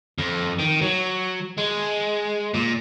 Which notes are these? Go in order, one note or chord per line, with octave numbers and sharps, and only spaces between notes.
F2
D#3
F#3
G#3
A#2